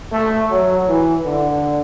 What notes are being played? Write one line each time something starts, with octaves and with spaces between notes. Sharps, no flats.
A3
F#3
E3
D3